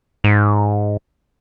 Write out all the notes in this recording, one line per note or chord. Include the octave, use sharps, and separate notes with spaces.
G#2